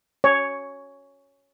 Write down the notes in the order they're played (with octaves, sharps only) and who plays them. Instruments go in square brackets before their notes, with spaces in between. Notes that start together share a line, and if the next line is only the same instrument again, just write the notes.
[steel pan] C#5